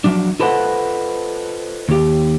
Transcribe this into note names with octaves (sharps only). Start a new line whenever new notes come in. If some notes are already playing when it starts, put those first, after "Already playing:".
F3 F#3 D4
F4 A4 B4 C5 D#5 F#5
D#2 G4